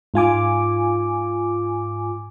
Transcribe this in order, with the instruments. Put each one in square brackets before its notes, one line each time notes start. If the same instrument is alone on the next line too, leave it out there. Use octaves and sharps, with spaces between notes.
[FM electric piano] G#2 F4 G#5 D6